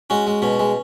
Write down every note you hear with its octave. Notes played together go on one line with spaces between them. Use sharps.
G#3 C#4 F#4
G#3
B2 C#4
G#3